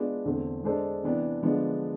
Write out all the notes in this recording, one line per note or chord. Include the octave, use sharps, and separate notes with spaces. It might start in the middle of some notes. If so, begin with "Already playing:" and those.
Already playing: G#3 B3 D4 F4 G#4
E2 D3 A3 C4
G#3 D4 A4 C5
C3 E3 B3 D4
D3 F3 G#3 B3 D4